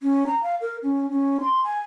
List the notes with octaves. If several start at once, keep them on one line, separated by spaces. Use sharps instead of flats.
C#4
A#5
F5
A#4
C#4
C#4
C6
G#5